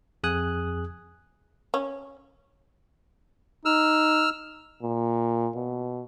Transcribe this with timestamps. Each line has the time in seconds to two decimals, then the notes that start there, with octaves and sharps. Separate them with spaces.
0.23 F2 G#4 G#5 D#6 F#6
1.74 C#4
3.65 D#4 E6 F6
4.83 A#2
5.56 B2